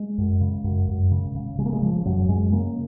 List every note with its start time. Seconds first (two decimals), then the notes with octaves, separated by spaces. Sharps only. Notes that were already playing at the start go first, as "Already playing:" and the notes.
Already playing: G#3
0.18 F#2
0.41 C#3
0.64 F#2
0.88 F#2
1.11 C#3
1.35 C#3
1.58 C#3 G#3
1.66 A#3
1.73 G#3
1.82 C#3 F3
2.05 F#2 F#3
2.29 F#2 G#3
2.52 C#3 A#3